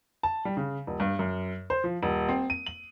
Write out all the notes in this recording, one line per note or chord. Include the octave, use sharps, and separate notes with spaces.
A5
G3
C#3
D#1
G2
F#2
C5
F3
D#1
C4
D#7
F#7